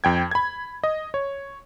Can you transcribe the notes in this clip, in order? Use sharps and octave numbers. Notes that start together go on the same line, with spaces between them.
F2 G5 G#6
B5 G#6
D#5
C#5